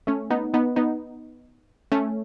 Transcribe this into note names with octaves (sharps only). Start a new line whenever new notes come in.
A3 C#4
B3 D#4
B3 D#4
B3 D#4
A3 C#4